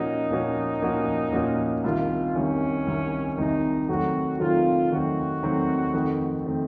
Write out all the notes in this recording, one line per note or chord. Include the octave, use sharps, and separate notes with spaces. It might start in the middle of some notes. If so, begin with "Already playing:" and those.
Already playing: A#2 F3 A#3 C#4 D#4 F#4
A#2 F3 A#3 C#4 F#4
A#2 F3 A#3 C#4 F#4
A#2 F3 A#3 C#4 F#4
C2 C3 D#3 F4
C2 C3 D#3 C#4
C2 C3 D#3
C2 C3 D#3 D#4
C3 D#3 F#3 A3 C4 F#4
C3 D#3 F#3 A3 C4 F4
C3 D#3 F#3 A3 C4 F#4
C3 D#3 F#3 A3 C4
F2 D#3 A3 C4
D#3 A3 C4